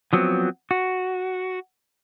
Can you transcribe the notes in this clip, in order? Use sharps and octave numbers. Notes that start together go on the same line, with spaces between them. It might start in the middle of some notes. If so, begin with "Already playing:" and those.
F3 F#3 B3 C4
F#4